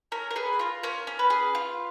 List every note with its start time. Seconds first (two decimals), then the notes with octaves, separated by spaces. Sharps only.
0.12 C#4 A#4
0.31 A#4
0.36 G#4 B4
0.59 F4 A#4
0.83 C#4 A#4
1.07 C#4
1.19 B4
1.30 G#4
1.55 F4